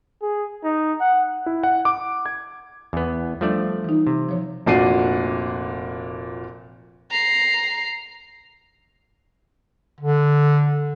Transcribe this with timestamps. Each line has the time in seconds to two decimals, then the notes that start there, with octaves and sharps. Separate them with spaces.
0.22 G#4
0.63 D#4
1.00 F#5
1.46 E4
1.63 F#5
1.85 D6
2.26 G#6
2.93 E2 B3
3.41 F3 G3 A3 D4 D5
3.84 E3 D#4
4.07 C3
4.29 F3 C#5
4.66 F1 A#2 D4 F#4 C7 D#7
7.11 A#5 C7
10.00 D3